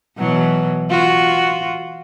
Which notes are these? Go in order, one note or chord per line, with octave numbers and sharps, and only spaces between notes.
B2 E3 F#3
F4 F#4